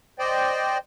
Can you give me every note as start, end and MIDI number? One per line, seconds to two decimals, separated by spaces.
0.19 0.78 72
0.19 0.78 74
0.19 0.78 75
0.19 0.78 79